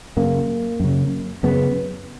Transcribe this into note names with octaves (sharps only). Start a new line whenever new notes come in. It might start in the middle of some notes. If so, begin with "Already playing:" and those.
F#2 C#3 A#3
F#2 C#3
F#2 C#3 B3